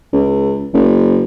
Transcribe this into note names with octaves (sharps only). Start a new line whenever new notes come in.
C#2
F#1